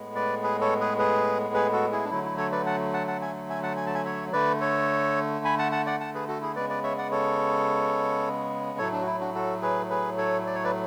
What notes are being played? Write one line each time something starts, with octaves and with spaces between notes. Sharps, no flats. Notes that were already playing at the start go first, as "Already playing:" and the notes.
Already playing: A2 G#3 B3
B4 D5
G#4 B4
A4 C#5
G#4 B4
G#4 B4
G#4 B4
F#4 A4
E4 G#4
D4
D3 F#3 A3 E4
E4
A4 C#5
B4 D5
F#5 A5
F#5 A5
F#5 A5
E5 G#5
E5 G#5
F#5 A5
G#5
A5
E5 G#5
C#5 E5
D3 A3 B4 D5
A4 C#5
G#5 B5
F#5 A5
F#5 A5
D5 F#5
F#5 A5
G#4 B4
F#4 A4
E4 G#4
C#3 G#3 B3 B4 D5
B4 D5
C#5 E5
D5 F#5
A4 C#5
A2 F#3 A3 A4 C#5
D4
F#4
E4
D4 F#4
F#4 A4
G#4 B4
G#4 B4
A4 C#5
D5
C#5
B4 D5